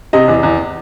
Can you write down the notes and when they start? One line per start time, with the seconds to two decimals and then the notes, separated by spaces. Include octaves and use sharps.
0.13 C3 D#5
0.28 E2
0.43 E2